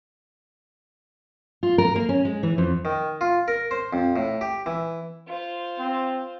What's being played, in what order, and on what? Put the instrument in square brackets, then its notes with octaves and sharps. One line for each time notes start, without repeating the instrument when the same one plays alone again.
[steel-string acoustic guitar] F4
A#4
A#3
C#4
G#3
E3
F2
[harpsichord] D#3
F4
A#4
C5
F2
A2
G4
E3
[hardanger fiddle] F4 C5
[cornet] C4